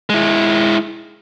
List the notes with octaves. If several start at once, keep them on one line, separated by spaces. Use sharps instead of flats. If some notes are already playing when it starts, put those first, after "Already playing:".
G#3 E4